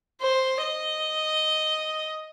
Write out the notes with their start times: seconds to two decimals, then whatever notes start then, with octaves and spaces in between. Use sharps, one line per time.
0.21 C5
0.62 D#5